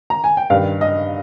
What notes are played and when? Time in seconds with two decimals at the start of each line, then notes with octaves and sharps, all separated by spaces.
0.10 A#5
0.24 G#5
0.37 G5
0.50 G2 D#3 F5
0.81 D#5